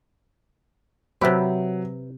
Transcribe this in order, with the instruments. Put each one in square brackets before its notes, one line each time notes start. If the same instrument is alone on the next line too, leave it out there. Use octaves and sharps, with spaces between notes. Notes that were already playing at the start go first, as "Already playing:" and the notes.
[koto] C3 G4 [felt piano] F#3 [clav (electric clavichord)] B4 E5